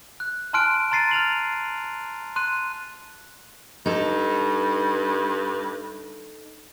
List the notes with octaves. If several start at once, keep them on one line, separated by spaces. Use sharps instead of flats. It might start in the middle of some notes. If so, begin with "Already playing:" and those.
F#6
G#5 A5 C6 F6 F#6 D7
A#5 C6 A6 C7 D#7
F6 A6 F7 F#7
C6 F#6 D#7
G2 D#4 A4